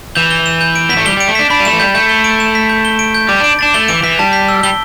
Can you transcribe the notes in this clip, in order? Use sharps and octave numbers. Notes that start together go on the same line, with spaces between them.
E3 G6
G7
E7
G6
D7
B3 B6
A3
G3 G7
G3 D7
A3
D4 B6
D4 B5
G3
A3 E7
E3
G3 G6
A3 G6
G7
D7
E7
B6
G6
G7
D7
G6
G3 D6
D4 D7
D4 A6
A3 G7
E3 D7
E3 B6
G3 A5
B6
E6
G3 G7